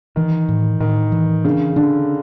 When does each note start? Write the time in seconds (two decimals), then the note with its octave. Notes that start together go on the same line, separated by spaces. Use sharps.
0.16 D#3 E3
0.49 A2
0.80 A2 D#3
1.12 E3
1.45 C#3 D4
1.76 D3 D4